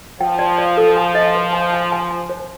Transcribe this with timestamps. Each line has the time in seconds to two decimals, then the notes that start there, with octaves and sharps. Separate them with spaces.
0.21 F3 G5
0.39 D5
0.58 D5
0.77 A4
0.97 G#5
1.15 D#5
1.35 B4
1.53 G#5
1.73 G#5
1.92 G#5
2.11 G#5
2.29 C5